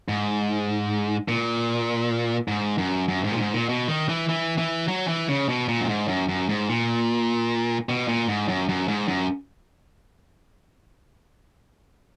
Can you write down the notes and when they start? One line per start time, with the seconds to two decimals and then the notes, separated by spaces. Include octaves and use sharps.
0.08 G#2
1.28 A#2
2.48 G#2
2.78 F#2
3.08 F#2
3.24 G#2
3.31 A#2
3.39 G#2
3.53 A#2
3.69 B2
3.88 D#3
4.09 E3
4.29 E3
4.58 E3
4.88 F#3
5.08 E3
5.29 C#3
5.49 B2
5.68 A#2
5.80 F#2
5.89 G#2
6.08 F#2
6.28 F#2
6.49 G#2
6.69 A#2
7.89 B2
8.08 A#2
8.29 G#2
8.48 F#2
8.69 F#2
8.88 G#2
9.08 F#2